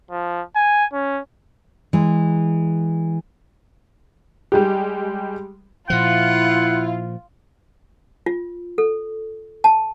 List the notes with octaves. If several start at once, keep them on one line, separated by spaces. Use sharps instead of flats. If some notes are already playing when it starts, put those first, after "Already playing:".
F3
G#5
C#4
E3 G#3
G3 G#3 G4
A#2 F3 E4 F4 F#5
F4
A4
A5